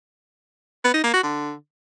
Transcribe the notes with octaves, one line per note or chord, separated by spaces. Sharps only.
B3
D#4
A#3
F#4
D3